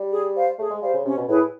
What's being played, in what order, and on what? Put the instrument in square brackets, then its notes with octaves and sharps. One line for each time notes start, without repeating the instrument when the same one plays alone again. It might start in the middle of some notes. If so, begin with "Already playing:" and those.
Already playing: [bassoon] G3
[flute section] G#4
C5 F5
[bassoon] A3 [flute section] G#4
[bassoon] G#3
[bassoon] G3 [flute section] C5 F5
[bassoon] C#3
[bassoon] C3 [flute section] C#4
[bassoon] B2
[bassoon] A2 [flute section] E4 G#4 B4